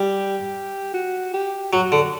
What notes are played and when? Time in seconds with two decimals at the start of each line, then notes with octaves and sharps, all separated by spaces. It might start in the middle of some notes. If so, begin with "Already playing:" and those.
Already playing: G3 G4
0.94 F#4
1.33 G4
1.73 F#3 F#4
1.92 D3